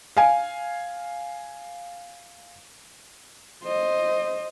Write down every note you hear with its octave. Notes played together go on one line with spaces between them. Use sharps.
F5 G#5
C5 D#5